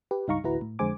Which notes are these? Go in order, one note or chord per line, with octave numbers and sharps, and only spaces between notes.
G4 B4
C#2 G2 D#4 F5 A#5 C#6
A1 D2 E4 F#4 B4 A#5
A2
F2 D3 G#3 C5 G#5 D6